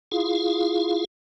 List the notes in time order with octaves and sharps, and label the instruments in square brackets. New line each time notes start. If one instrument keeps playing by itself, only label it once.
[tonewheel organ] E4 F4 G#4 F5